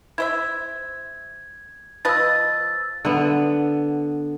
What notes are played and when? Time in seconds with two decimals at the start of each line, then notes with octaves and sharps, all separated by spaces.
0.18 E4 C5 E5 G#6
2.05 F3 B4 D#5 E6 A6
3.05 D3 B3